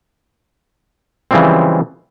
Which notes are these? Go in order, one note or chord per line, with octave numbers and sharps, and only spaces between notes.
C#3 E3 F3 G3 G#3 C4